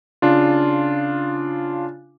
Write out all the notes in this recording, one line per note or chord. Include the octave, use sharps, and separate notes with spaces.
C#3 D4 F4